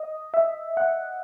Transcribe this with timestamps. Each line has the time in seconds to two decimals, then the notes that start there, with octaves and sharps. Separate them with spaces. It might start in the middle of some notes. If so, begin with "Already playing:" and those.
Already playing: D#5
0.34 E5
0.77 F#5